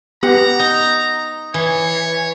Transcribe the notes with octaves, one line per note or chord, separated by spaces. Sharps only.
B3 G4 F#5 A#5
D#4
E3 C#5